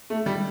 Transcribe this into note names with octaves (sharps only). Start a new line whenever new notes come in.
A3
G3